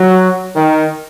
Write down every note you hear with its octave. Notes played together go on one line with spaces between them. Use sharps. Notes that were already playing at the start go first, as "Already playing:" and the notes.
Already playing: F#3
D#3